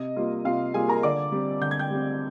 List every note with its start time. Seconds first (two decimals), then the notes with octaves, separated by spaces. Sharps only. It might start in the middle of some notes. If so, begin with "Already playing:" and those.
Already playing: C3 D#5
0.16 G3 A#3 F4
0.45 C3 F4 F5
0.74 G3 A#3 F4 G#4 G#5
0.88 A#4 A#5
1.03 D3 D5 D6
1.32 G3 C4
1.61 D3 G6
1.71 G#6
1.79 G5 G6
1.91 G3 C4